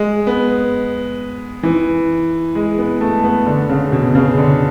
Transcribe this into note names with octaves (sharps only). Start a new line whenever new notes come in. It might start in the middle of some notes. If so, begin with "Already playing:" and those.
Already playing: G#3
B3
E3
G#3
B3
A3
B3
D3
C#3
B2
C#3
D3